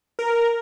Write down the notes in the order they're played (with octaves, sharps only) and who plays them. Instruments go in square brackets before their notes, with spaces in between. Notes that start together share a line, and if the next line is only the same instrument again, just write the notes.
[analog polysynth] A#4